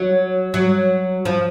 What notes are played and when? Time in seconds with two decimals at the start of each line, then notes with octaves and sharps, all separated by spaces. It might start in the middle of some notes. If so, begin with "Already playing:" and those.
Already playing: F#3
0.54 F#3
1.25 F3